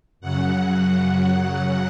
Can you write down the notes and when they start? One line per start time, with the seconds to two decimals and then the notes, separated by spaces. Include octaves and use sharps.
0.21 F#2 C#3 F#3 F#5